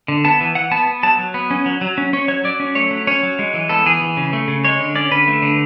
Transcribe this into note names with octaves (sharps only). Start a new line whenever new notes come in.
D3
B3 A5
E3
E3 F#5
B3 A5
B3
F#3 A5
F#3
B3
C#4
F#3
F#3
C#4
C#4 C#5
F#3 C#5
F#3 D5
C#4
A3 C#5
F#3
C#4 C#5
F#3
G#3
E3
B3 A4
E3 G#4
E3
C#3
A3
C#3
G#3 C#5
D3
C#4 D5
D3 B4
A3
D3